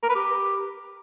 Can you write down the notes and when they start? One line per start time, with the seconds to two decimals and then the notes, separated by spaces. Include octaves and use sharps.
0.03 A#4
0.09 B4
0.15 G4